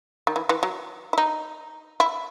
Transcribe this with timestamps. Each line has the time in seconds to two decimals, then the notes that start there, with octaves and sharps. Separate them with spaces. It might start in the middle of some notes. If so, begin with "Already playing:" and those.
0.27 D#3
0.36 E3
0.49 E3
0.63 F#3
1.13 E4
1.18 D#4
2.00 E4